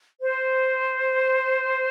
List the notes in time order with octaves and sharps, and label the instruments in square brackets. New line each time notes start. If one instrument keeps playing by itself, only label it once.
[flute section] C5